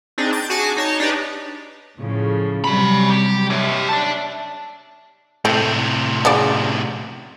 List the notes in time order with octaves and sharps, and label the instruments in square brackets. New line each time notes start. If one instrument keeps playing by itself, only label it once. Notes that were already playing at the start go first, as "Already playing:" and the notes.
[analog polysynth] C4 D4 D#4 G#4
G6 A6 D7
F#4 G#4 G#5 A5 D6
D#4 C#5 A5
D4 D#4 G4 B4
[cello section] A2 C#3 F3
[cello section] C3 F#3 G3 [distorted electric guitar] C#4 B5
[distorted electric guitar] G4
[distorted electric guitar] G4 C#5 [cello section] E5
[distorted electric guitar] D5 A5
[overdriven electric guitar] A2 C3 [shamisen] A3 C4
[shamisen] C#3 F#4 D5